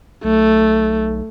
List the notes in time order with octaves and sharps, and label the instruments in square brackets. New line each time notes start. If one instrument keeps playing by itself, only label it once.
[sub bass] B1 [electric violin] A3